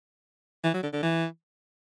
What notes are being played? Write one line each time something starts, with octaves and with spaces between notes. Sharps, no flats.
E3
F#3
D3
D3
E3